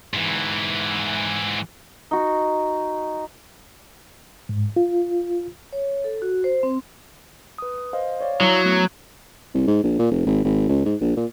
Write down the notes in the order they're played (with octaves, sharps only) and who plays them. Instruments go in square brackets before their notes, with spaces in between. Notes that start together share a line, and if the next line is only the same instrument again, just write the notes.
[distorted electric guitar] G#2 E3
[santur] D#4 F#4
[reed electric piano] G#2
F4
[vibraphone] C#5
A4
F#4
C5
C4
[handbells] B4 D#6
C5 D#5 F5
C#5 D5 F5
[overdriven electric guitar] F#3 [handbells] E4 D#6
[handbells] A3 B3 G#6
[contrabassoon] C2
G#2
A#1
A#2
F1
G#1
G#1
C#2
G#2
A#1
A#2